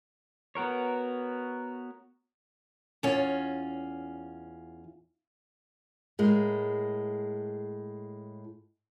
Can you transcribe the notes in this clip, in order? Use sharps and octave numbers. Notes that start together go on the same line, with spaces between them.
B3 F#4 A#4 C#5
E2 C#4 F4
A2 G#3 A#3